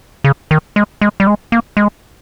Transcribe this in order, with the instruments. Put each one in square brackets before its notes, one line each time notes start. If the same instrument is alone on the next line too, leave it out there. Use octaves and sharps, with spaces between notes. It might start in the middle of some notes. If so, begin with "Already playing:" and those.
[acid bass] C#3
D#3
G#3
G#3
G3
G#3
A#3
G#3